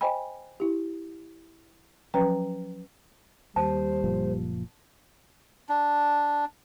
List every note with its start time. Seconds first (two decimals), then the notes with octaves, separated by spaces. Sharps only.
0.01 C5 D#5 G5 G#5 B5
0.60 E4 G4
2.14 F3 F#3 C#4 B4 G5 A#5
3.56 D#2 G3 C5 A5
4.04 F#1 A#2 F3
5.69 D4